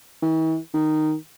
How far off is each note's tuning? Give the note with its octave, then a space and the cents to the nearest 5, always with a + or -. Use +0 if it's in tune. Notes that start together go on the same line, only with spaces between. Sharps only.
E3 -45
D#3 -5